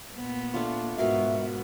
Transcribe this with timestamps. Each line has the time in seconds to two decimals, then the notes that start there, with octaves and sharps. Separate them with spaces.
0.15 A#2 B3
0.54 A3 D4 F4
0.98 G#2 B2 B3 A#4 E5 F5